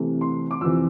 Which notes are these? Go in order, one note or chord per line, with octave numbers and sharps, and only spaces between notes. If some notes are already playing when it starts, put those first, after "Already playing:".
Already playing: C3 E3 A3
C6
D6
F2 C3 E3 E6